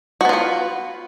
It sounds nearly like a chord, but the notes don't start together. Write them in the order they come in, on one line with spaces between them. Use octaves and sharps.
F#4 B3 F4 B4